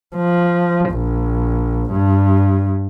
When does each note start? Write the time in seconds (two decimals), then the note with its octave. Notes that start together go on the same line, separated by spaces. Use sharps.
0.16 F3
0.91 A#1
1.91 G2